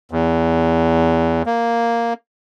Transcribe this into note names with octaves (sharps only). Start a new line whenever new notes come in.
E2
A#3